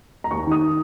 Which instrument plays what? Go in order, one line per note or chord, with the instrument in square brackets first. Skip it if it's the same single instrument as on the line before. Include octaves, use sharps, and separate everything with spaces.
[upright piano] A#5
D#2 C#6
D#3 D#6